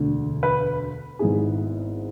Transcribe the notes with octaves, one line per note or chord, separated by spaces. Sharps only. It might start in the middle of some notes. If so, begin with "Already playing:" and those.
Already playing: E1 D2 D3
B4
G#1 G#2 G#3 B3 E4 G#4